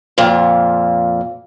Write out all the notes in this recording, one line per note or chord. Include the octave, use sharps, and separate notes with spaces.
F2 A#2